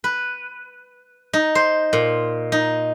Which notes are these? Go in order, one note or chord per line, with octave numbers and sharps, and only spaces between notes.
B4
D#4
C5
A#2
D#4